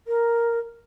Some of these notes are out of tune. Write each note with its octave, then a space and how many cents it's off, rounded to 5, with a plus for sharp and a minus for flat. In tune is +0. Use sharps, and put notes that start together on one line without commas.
A#4 +0